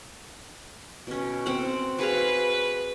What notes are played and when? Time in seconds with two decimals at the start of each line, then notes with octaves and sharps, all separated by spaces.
1.07 B2 C#4
1.46 C4 F#5
1.99 F#4 G#4 B4 F5